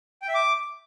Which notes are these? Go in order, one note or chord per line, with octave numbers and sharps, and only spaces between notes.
G5
E5
D6